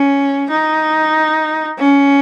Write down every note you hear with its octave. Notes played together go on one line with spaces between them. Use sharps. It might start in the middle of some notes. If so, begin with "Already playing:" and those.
Already playing: C#4
D#4
C#4